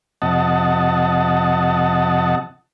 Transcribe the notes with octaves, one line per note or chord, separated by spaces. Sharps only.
F2 C3 D#5 F#5 A5